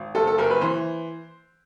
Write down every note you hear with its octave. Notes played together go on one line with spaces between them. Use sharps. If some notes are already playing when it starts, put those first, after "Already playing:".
Already playing: G#1
F#1 A4
A4
F#1 A#4
B4
E3 C5